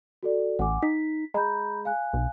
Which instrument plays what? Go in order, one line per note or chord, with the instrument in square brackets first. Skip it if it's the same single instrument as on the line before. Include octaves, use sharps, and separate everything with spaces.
[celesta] F#4 A4 D5
[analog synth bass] A1 [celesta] F#5 G#5 D6
[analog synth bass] D#4 [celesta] B6
[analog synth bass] G#3 [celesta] A#5 B5 G6
[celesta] F5 G#5 F#6
[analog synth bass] B1